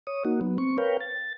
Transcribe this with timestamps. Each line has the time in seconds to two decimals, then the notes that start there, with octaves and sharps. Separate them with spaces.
0.07 C#5 D#6
0.25 A#3 D#4 F#4
0.41 F#3 B3
0.58 C4 C#6
0.78 A#4 B4 C#5 F5 G5
1.01 A6